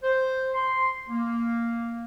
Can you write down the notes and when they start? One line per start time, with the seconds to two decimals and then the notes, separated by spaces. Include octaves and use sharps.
0.04 C5
0.54 C6
1.09 A#3